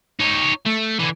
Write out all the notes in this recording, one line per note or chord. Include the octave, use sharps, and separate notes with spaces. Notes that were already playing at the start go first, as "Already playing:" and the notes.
D#4 C#5
A3
D3 E3